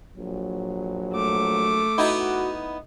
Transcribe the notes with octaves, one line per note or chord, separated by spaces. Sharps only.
A#1 F#3
A3 D6
B3 D#4 E4 F#4